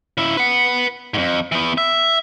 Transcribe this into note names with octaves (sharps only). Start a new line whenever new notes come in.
C#3 E4
B4 F#5
F2 G#2
E3 B3
E5